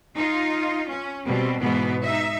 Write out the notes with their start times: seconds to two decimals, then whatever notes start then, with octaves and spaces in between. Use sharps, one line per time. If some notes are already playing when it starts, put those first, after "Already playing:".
0.15 D#4 F4
0.89 C#4
1.26 B2 G3 C4
1.60 G#2 B2 E3 B3
2.02 D#4 E5